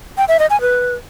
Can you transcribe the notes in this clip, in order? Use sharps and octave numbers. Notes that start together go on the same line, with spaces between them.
G5
E5
D#5
G#5
B4